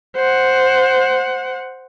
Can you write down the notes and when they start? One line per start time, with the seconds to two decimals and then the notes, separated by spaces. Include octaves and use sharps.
0.16 C5 F#5